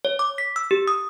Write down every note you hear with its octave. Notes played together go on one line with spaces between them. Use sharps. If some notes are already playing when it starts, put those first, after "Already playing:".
C#5
D6
B6
E6
G4
D#6